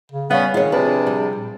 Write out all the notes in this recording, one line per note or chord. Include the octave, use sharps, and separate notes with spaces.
C#3
G3 B3 C#4 F5
G#2 D#3 F4 G#4 C#5
C3 F3 D4 B4
G3
A#2